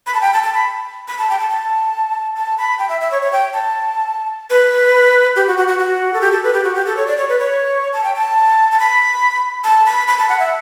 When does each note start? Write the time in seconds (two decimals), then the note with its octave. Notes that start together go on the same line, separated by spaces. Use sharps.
0.07 B5
0.14 A5
0.21 G5
0.33 A5
0.43 A5
0.55 B5
1.08 B5
1.19 A5
1.30 G5
1.39 A5
1.50 A5
2.36 A5
2.58 B5
2.79 G5
2.89 E5
3.01 E5
3.11 C#5
3.22 C#5
3.33 G5
3.53 A5
4.50 B4
5.36 G4
5.47 F#4
5.58 F#4
5.68 F#4
5.79 F#4
6.14 A4
6.21 G4
6.32 A4
6.43 B4
6.53 G4
6.64 F#4
6.75 G4
6.86 A4
6.97 C#5
7.07 D5
7.18 C#5
7.29 B4
7.40 C#5
7.93 A5
8.04 G5
8.15 A5
8.72 A5
8.79 B5
9.64 A5
9.86 B5
10.08 B5
10.18 A5
10.29 F#5
10.40 E5